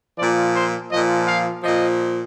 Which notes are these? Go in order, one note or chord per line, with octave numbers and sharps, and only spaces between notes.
A#2 F3 D5
C5
A#2 F3 D#5
F5
A#2 F3 D#5